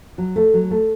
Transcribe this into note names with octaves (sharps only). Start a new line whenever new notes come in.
F#3
A3
F#3
A3